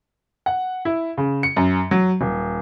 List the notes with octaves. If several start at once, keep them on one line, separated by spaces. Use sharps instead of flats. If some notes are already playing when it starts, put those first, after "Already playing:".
F#5
E4
C#3
C#7
F#2
F#3
D#1